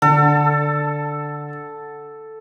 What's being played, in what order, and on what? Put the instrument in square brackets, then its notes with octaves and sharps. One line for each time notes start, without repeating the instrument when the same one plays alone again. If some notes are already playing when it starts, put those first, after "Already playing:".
[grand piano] D3 [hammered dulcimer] A4